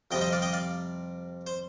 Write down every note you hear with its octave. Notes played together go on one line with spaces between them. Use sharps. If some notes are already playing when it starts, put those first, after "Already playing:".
F2 C3 G3 D#5 G5
C5 D#5
D5 F5
D#5 G5
D5 F5
C5